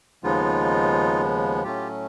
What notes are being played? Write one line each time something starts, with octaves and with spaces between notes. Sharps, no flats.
D#2 C#3 F3 G#3 B3 D#4 F4
A2 F#3 A3 C#4 F4 G4